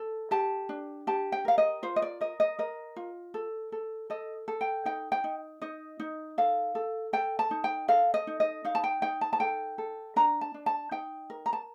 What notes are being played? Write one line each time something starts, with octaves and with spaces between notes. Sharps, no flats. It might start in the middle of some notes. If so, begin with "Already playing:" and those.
Already playing: A4
G4 A5
D4
G4 A5
G5
A#4 F5
D#5
F4 C5
D#5
D5
A#4 D#5
D#5
A#4 D#5
F4
A4
A4
A4 D#5
A4
G5
D#4 G5
G5
D#4
D#4 D#5
D#4
A4 F5
A4
A4 G5
A5
D#4
G5
A4 F5
D#5
D#4
D#5
D#4 F5
A5
G5
D#4 G5
A5
A5
A4 G5
A4
D4 A#5
A5
D4
A5
D#4 G5
A#4
A#5
A5